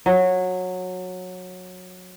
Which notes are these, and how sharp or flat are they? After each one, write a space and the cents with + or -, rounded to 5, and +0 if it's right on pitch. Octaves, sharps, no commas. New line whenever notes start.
F#3 -15